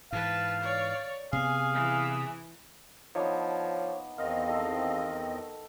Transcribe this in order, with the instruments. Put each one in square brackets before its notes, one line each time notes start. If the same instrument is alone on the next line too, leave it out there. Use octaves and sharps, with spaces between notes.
[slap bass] G#2 E3 [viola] B4 A5 [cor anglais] F5
[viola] C#5 D5
[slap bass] C3 B3 [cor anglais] G#4 [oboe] F5 [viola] G#5
[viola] E3
[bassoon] F3 [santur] B3 D4 D#4 [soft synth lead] C#5
[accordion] E2 C4 D#5 [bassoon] D#3 [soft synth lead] F5
[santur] D#4 A4